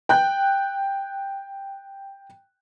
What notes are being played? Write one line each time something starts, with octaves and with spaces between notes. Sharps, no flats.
G5 F#6 G6